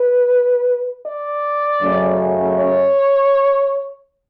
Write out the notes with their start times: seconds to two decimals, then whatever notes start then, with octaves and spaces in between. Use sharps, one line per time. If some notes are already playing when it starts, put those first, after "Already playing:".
Already playing: B4
1.05 D5
1.80 F#2 C#3 F#3 A3 C#4
2.56 C#5